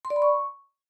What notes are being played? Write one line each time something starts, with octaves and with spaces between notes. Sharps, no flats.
C6
D5
B5
C#6